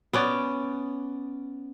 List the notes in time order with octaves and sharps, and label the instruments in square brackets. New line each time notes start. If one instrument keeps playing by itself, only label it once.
[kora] B3 C#4 D5